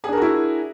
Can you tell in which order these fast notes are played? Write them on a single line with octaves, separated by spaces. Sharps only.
G#4 D4 A#4 F#4 E4